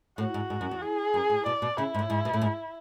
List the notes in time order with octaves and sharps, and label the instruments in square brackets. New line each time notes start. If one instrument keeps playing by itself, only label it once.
[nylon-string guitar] A2 [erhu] F#4
[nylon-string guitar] G#2
G#2
F#2
E2
[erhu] G#4
[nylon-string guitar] F#2
A2
[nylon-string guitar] B2 [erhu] D5
[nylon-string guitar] B2
[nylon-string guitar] C#3 [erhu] E4
[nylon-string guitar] G#2
A2
G#2
B2
A2
G#2